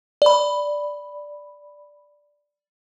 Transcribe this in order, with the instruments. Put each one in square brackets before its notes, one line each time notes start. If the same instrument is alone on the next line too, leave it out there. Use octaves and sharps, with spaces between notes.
[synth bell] D5 B5